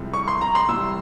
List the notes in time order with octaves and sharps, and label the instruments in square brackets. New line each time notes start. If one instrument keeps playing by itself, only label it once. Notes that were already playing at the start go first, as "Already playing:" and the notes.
Already playing: [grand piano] C2 C3 F3 G#3 E4
[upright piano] C#6
C6
A#5
C6
[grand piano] C2 C3 E3 G3 [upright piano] E6